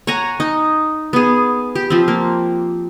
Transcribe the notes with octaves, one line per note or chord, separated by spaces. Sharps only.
C#5 F#5 G#5 A#5
D#4
B3 G#4
G4
F3 C4
A#3